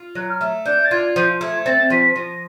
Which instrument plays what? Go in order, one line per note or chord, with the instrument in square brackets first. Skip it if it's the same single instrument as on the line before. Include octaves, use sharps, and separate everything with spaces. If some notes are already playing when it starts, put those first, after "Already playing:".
Already playing: [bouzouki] F4
[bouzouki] F#3 [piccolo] F#6
[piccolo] F6
[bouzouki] A3
[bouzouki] D4 [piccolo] G6
[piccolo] A6
[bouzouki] F4 [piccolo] G#6
[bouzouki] F3 [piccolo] G6
[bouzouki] A3 [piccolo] G#6
[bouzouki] C4 [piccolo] A6
[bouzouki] F3 [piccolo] B6
[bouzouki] F3 [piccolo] A#6